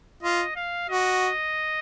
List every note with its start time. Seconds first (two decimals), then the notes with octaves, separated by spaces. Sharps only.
0.23 F4 D#5
0.56 F5
0.89 F#4 D#5